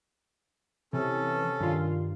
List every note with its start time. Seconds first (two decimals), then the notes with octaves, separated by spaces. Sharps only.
0.93 C3 E3 C#4 A4
1.60 G2 D#3 F4